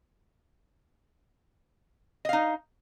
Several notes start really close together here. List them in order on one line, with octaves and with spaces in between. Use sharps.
D#5 F5 D#4